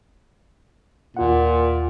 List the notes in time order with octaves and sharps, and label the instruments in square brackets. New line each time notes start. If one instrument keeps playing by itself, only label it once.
[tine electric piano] D#2 F4 F#5 [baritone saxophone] A#2